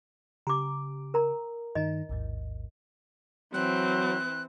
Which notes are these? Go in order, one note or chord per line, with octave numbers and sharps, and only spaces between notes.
C#3 G4 A#5 D6
A#4 A#5
G2 D#3 D#4 D#5
A1 D#2 G#2
E3 F#3 C4 F#6